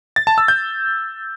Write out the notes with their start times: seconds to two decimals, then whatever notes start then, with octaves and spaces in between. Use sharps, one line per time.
0.16 A6
0.27 A5
0.38 E6
0.48 G6